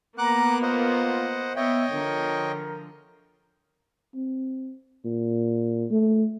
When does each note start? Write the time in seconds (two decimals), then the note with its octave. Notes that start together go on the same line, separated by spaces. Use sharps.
0.18 A#3 B3 F#5 A#5 D6 F#6
0.62 F4 C5 D#5 F#5
1.56 B3 C#5 D#5 E5 G5
1.93 D3 F3 A#4
4.15 C4
5.05 A#2
5.91 A3